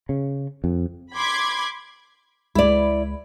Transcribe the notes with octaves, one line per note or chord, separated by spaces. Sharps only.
C#3
F2
B5 C6 D6 G#6
C#2 G#3 E4 D5 B5